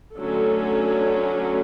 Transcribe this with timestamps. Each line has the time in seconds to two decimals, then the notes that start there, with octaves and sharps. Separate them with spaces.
0.15 D3 F#3 A3 C#4 A4